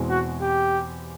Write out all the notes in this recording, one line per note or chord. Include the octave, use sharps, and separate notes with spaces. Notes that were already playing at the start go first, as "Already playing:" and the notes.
Already playing: E2 B2 G#3 C4 E4
F#4
G4